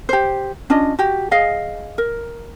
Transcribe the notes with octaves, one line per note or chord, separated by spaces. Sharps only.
G4 C5
C#4 D4 F4 D#5
F#4 G4
G#4 D#5 F5
A#4